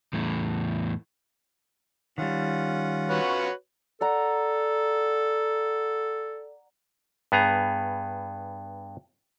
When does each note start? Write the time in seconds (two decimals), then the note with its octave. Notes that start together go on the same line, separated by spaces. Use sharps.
0.13 E2 A2
2.18 D#3 G3 C#4 F4 F#5
3.10 F#4 B4 C#5
4.01 A4 D5 F#5 A#5
7.32 G2 B3 G#4 A#5